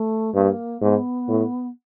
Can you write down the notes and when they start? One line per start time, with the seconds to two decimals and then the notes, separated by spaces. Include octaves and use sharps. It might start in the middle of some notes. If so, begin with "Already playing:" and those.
Already playing: A3
0.35 G2 A#3
0.81 G#2 B3
1.28 A2